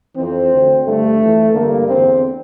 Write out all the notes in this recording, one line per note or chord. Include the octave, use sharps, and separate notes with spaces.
F2 E3 C4
D2 D3
G2 D3 A3
F2 E3
G2 D3 A#3
E2 D3 C4